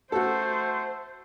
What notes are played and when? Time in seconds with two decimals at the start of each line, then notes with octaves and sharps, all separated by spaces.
0.12 A3 F#4 A4 C5